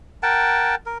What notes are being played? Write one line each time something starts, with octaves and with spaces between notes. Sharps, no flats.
A#4 F#5 G5 A5
A#4